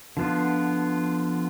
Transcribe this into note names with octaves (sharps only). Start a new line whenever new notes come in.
D3 F3 B3 F4